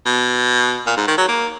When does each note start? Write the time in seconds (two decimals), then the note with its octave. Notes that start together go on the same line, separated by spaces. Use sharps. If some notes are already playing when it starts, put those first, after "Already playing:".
0.06 B2
0.87 A#2
0.97 G#2
1.08 D#3
1.18 F#3
1.28 A#3